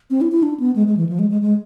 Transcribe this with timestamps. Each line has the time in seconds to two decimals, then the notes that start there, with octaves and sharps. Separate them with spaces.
0.10 C4
0.21 E4
0.32 E4
0.43 D4
0.60 B3
0.76 G#3
0.87 G#3
0.97 E3
1.09 F3
1.19 G#3
1.30 G#3
1.41 G#3